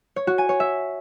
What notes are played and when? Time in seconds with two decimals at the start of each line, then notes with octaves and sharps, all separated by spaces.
0.16 C#5
0.27 F#4
0.38 G#5
0.49 C#5
0.60 E5